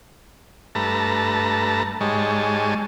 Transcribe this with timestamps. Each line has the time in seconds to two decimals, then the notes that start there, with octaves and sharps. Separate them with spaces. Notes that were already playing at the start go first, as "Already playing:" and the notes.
0.75 G2 A3 B4 A5 A#5
2.01 G#2 G3 G#3 C#5 D#5 A5